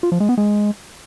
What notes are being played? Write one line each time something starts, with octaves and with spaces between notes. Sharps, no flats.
F4
F3
G#3
B3
G#3